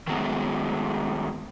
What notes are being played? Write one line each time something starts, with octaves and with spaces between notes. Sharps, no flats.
D#3 F#3 G#3 A3 B3